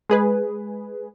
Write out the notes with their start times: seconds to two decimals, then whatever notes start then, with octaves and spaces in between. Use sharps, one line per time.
0.09 G#3 G#4 B4